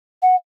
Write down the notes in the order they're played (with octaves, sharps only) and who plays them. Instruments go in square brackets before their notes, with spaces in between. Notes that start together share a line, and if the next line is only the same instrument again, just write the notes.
[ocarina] F#5